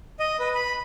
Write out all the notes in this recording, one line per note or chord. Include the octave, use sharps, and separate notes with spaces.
D#5
B4
B5